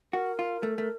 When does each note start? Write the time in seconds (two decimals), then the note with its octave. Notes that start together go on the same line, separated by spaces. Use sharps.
0.13 F#4 A#4
0.39 F4
0.63 A3
0.78 A3